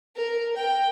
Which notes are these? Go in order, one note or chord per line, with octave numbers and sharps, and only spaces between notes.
A#4
G5